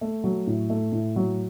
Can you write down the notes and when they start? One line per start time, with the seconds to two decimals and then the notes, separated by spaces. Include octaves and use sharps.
0.01 A3
0.24 F#3
0.47 A2
0.70 A3
0.92 A2
1.16 F#3